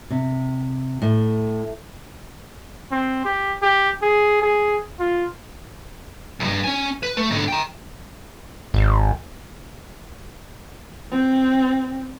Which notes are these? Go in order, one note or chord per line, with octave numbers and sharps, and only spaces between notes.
C3
A2
C4
G4
G4
G#4
G#4
F4
B1 G2
C#4 G#5
B4
A3
G#2 D3
G5 A#5
G#1
C4